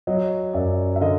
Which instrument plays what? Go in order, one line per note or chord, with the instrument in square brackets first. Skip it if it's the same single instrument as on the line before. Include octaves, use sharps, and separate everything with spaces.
[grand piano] F#3 C#5 D#5
F#2 D5 E5
E5
D3 D#5 F5